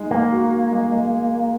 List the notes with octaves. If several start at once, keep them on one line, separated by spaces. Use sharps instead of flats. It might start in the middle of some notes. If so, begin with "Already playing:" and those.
Already playing: G#3 D#4
A#3 D#4
F#4
F#4
G#3
G#3